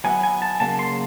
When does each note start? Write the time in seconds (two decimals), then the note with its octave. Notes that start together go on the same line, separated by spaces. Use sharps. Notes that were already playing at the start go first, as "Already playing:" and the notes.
0.04 F#3 B3 E4 G#5
0.23 G#5
0.42 A5
0.60 C#3 F#3 A#3 A5
0.79 C6